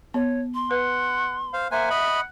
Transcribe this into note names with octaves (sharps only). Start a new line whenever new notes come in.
B3 C#5
C6
B4 F#5
C5 F5
A#3 C5 E5 F#5 G#5
D#5 B5